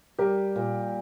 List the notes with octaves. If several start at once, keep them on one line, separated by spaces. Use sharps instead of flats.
G3 G4 A#4
A#2